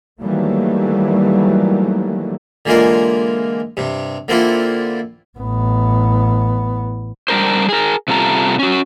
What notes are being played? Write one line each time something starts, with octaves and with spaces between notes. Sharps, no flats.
D#3 E3 F#3 G3 A3 A#3
D3 E3 G#3 A#3 F4 A#4
G2 C3
D3 A#3 C4 E4 F4 A4
A1 B3
G3 D4 A#4 C5
G#4 A#4
C3 G3 F4 A4 A#5
C#4 F#4